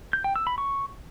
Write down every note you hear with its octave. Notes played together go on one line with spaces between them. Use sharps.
G6
G5
E6
B5
C#6